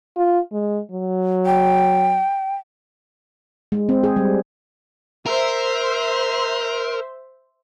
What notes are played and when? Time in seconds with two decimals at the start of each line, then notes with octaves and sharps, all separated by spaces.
0.17 F4
0.52 G#3
0.92 F#3
1.46 G5
3.72 G#3
3.89 C4
4.04 G#4
4.16 G3
5.26 A#4 C5 E5